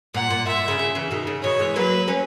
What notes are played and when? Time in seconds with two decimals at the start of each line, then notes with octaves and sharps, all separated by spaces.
0.14 A#2 F#5
0.30 A#2
0.47 A#2 E5
0.58 A#2
0.68 C#3
0.79 C#3
0.95 C#3 E3
1.11 B2 D#3
1.27 C#3
1.43 B2 D#3 C#5
1.59 E3 G#3
1.76 F#3 A#3 B4
2.08 A#3 C#4